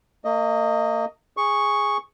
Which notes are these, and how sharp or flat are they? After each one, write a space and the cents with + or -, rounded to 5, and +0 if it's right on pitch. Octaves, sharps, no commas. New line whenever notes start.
A#3 -35 D#5 +0
G#4 -10 C#6 +0